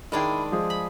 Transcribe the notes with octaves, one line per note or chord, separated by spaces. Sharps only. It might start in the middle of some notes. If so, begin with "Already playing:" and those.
D#3 G#3 D4 E4 G#4 G5
F3 G#3 G#4
B5